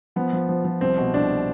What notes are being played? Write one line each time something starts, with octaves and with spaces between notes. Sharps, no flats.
F3 B3
F3
F3
F3
C2 C4
B2
C2 D4